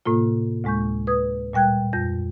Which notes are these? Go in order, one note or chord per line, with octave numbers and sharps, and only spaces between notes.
A2 C3 A#3 F4
D2 A2 G#3 C#6 G6
B4 D#6 G#6
A#2 G3 G5 F#6 G#6
F2 G6 A#6